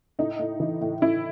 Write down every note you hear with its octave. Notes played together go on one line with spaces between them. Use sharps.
A2 D#4
A2
E3
A2
A2 E4